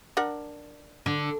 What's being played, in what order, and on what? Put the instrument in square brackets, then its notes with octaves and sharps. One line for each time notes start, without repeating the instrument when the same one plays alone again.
[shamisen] D4 A#4 F#5
[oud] D3